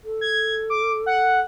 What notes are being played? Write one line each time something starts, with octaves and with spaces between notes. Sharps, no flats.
A4
G#6
D6
F#5